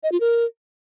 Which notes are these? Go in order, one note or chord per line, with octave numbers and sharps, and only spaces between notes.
D#5
F4
A#4